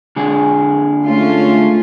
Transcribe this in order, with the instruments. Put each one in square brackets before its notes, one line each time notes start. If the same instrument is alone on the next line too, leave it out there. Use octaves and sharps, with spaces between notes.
[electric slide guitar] D3 G#3 G#4
[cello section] A3 C#4 F4